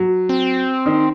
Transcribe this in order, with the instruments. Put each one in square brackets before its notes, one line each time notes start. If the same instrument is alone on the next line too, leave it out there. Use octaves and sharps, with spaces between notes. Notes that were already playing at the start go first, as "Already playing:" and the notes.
Already playing: [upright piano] F#3
[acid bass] C4
[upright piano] D#3